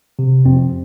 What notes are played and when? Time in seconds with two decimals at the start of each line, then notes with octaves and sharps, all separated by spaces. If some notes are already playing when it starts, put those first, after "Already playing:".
0.19 C3
0.45 F2 C4